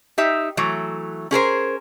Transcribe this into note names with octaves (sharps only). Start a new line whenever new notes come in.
D#4 G4 E5
E3 F#3 A3
C#4 G#4 A#4 C5